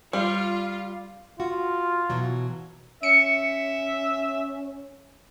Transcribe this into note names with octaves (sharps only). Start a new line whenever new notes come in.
G3 F4
F4 F#4
B2 E3 F#3
C#4 E5 C#7